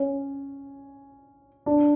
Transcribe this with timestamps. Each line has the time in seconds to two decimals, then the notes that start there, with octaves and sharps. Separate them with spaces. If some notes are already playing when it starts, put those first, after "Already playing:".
Already playing: C#4
1.66 D4